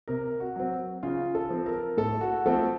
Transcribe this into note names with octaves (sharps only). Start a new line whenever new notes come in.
C3 A#4
F#4
F#3 C4
C#3 F4
A4
F3 C4
A#4
A2 A4
F#4
F3 A3 C4 A4